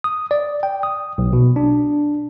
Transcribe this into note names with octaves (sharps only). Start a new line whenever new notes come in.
D#6
D5
G5
D#6
B1
B2
D4